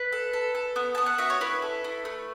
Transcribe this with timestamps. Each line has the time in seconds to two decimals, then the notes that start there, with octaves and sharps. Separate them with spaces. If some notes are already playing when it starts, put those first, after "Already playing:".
Already playing: B4
0.12 A4
0.33 A4
0.55 A4
0.76 B3
0.95 B3 A5
1.06 F#5
1.18 F#4 E5
1.30 C#5
1.41 E4 B4
1.62 A4
1.84 E4
2.05 A3